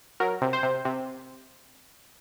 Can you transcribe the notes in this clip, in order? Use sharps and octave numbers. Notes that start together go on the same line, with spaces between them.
F#3 A#4
C3
C5
C3
C3